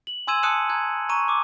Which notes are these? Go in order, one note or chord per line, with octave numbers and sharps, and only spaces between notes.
F#7
G#5 C6 E6 G#6 D#7 E7
A5 D#6 F#6 C#7 D#7 E7
A#5 F#6 G#6
A#5 C#6 D#7
D6 D#6